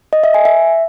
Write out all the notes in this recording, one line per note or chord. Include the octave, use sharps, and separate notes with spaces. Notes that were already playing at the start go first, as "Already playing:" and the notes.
D#5
E5
G#5
E5